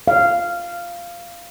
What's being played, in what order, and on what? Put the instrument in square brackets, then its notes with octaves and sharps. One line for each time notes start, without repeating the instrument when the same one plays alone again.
[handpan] F5